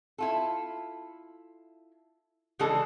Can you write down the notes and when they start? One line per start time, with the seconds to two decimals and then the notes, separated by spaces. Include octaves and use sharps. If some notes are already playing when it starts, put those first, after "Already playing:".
0.18 E4 F4 A4
2.59 C#3 E3 G#3 D4 G#4 A4